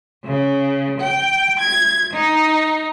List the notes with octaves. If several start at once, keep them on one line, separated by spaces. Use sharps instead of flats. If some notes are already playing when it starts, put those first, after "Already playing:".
C#3
G5
G#6
D#4